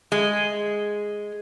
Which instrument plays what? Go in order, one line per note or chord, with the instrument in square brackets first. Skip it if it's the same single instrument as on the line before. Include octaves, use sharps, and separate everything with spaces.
[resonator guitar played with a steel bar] G#3